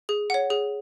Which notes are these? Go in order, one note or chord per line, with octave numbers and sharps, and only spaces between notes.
G#4
C#5 F#5
G#4